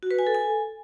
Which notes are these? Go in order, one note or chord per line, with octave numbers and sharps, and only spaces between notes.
F#4
B4
G#5
A4
G#5